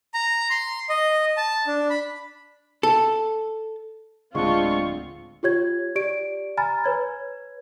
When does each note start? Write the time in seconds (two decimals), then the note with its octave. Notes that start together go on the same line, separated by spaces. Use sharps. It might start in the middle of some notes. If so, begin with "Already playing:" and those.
0.14 A#5
0.50 C6
0.89 D#5
1.37 A5
1.67 D4
1.90 B5
2.83 A4
4.35 D1 D3 G#3 C4 D4 F4 C#6
5.43 F4 G4 C#5 G#6
5.95 G4 D5 D7
6.57 G#5 A#5 B5 F6 A6
6.84 B4 C#5 G#6